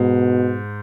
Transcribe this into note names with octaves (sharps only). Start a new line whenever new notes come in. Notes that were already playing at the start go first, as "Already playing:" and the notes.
Already playing: G#2 B2